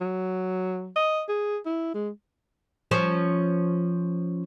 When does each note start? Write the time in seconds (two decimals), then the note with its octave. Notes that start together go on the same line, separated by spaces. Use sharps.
0.01 F#3
0.96 D#5
1.29 G#4
1.66 E4
1.94 G#3
2.91 F3 C#4 C5